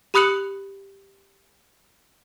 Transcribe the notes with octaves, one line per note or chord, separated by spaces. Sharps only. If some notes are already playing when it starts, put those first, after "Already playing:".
G4 B5 D#6 F#6 C#7 F#7